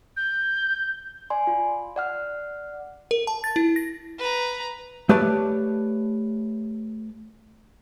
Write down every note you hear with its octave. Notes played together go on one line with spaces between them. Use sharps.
G6
D5 G#5 C6
F4
D5 F#5 F6
A#4
A5
A6
E4
A#6
B4 A#5
A3 G4 B4 C#5 D5 A5